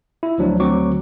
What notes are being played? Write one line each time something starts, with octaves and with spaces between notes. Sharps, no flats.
E4
D2 F3 F#3 D4
D2 F#3 C4 C#6 D6